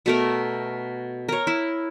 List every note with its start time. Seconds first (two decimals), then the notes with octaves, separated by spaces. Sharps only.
0.06 B2 A3 A#4
1.29 A#4 C#5
1.47 E4